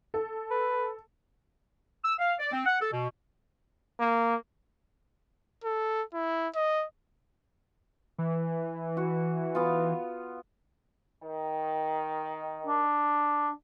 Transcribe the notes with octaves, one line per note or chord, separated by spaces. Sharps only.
A4
B4
E6
F5
D5
C4
F#5
A4
B2
A#3
A4
E4
D#5
E3
F#4
B3 F4
D#3
D4